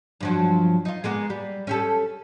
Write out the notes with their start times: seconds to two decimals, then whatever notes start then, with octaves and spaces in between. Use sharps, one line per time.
0.20 G2 F3 F#3
0.85 D#4 F4
1.04 G#3 A#3 B3
1.30 G3
1.67 C#4 G4 A4